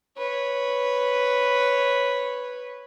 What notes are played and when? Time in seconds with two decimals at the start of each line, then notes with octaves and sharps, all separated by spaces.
0.17 B4 C#5